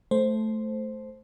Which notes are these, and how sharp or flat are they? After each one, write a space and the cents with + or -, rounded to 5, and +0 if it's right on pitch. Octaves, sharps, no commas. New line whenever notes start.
A3 -10 C5 +0